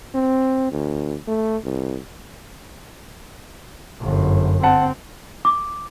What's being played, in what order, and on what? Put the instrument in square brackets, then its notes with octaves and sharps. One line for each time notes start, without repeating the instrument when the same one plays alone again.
[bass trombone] C4
D2
A3
C2
[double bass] G1 F#2
[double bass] C4 [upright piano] F#5 A5
[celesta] D6